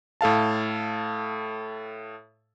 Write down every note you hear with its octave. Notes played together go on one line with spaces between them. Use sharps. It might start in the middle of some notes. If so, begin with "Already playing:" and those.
A2 A4 F5 A5